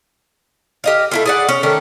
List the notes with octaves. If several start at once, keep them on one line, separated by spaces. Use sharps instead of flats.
G4 D#5 F5
A3 E4 F4
G#4 D5 F#5
C#4
D#3 A3 C#4 D4